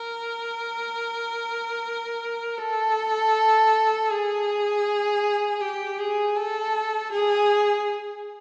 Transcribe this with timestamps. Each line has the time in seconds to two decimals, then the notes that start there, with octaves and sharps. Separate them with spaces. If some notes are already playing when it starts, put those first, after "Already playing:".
Already playing: A#4
2.58 A4
4.10 G#4
5.60 G4
5.98 G#4
6.36 A4
7.12 G#4